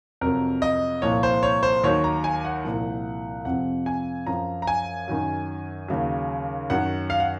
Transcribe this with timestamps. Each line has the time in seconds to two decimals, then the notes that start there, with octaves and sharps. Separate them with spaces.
0.21 F2 C3 F#3 A#4
0.62 D#5
1.02 C2 A#2 F3 C#5
1.23 C5
1.43 C#5
1.63 C5
1.84 D#2 D#3 F#3 C#5
2.04 A#5
2.24 G#5
2.45 F#5
2.64 C2 A#2 F3
3.45 F2 C3 F3 F#5
3.86 G#5
4.27 F#2 F3 A#5
4.62 A#5
4.67 G#5
5.08 F#2 D#3 F#3
5.88 D#2 C#3 F#3
6.70 F#2 D#3 F#3 F#5
7.10 F5
7.20 F#5